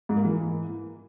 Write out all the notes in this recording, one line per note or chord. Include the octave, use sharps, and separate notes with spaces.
G#2
A#3
E3